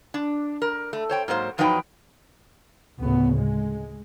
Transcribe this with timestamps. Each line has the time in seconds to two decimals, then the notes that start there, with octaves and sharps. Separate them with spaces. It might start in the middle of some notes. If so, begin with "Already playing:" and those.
0.14 D4
0.62 A#4
0.93 A3
1.09 C5 C#5 G5
1.28 G#2 F#3 A#3 C5
1.58 E2 F3 F#3 D#4 B4 G5
2.98 D2 A2 C#3 B3
3.37 G#3